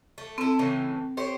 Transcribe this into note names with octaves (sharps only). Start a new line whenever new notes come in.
A3
C4 E4 A4
A2 C#3 E3
G4 C5 C#5